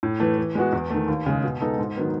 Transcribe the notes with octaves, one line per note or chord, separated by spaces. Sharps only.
A2
E3 A3
E3
G#3 B3 F#4
E2
D#3 A3
D#2
C#3 G#3
B2
G#3 B3 D#4 A4
G#2
D#3 F#3 B3